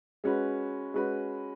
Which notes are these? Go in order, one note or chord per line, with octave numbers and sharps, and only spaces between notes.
G#3 C#4 F#4 B4
G#3 C#4 F#4 B4